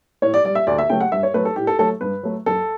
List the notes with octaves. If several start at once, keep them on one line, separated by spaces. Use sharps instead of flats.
A2 C#5
D5
G3 D5
E5
D2 D5
E5
C#3 F#3 A3 G5
F#5
G2 E5
C#5
F#3 A3 B4
A4
A2 G4
A4
F#3 A3 A4
G2 B4
F#3 A3
F#2 A4